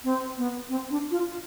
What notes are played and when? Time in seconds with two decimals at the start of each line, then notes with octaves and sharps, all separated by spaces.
0.04 C4
0.37 B3
0.69 C4
0.90 D4
1.11 F4